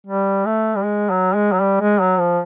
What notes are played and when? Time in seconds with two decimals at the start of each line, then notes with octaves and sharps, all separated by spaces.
0.07 G3
0.46 A3
0.76 G3
0.84 G#3
1.10 F#3
1.35 G#3
1.53 F#3
1.61 G3
1.81 G#3
2.01 F#3
2.20 F3